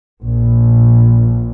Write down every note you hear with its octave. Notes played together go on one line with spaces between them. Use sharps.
A#1